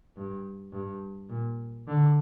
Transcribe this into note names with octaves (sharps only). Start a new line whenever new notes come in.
G2
G2
A#2
D3